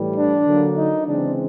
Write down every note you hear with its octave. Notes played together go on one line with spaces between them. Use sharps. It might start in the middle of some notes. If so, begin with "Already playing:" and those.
Already playing: A2 E3 G3
D4
D3 F#3 A#3
D#4
C#3 E3 G#3 C4 D4